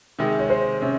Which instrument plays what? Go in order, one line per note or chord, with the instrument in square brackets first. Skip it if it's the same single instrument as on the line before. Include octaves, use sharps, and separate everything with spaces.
[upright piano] C3 D#3 G#3
[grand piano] C#5
C5
[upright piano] C3 [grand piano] C#4